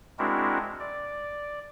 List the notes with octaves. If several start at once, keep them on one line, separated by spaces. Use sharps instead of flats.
G#3 C4 D4 E4 F#4 A#4
D5